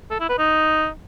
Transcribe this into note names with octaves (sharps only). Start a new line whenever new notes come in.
A4
E4
B4
D#4